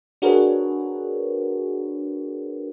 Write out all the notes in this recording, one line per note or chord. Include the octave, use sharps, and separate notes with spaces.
D4 F#4 G#4 A#4 B4 C#5